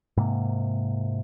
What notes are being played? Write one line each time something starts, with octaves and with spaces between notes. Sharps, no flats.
G#2 C3 A#3